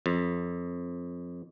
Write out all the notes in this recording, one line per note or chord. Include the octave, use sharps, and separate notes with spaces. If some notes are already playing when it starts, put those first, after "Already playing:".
F2